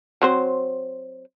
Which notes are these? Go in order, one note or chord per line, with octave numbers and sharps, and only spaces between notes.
F#3 C4 C5